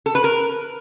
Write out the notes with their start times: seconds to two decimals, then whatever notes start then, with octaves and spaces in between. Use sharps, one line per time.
0.06 A4
0.15 B4
0.24 A#4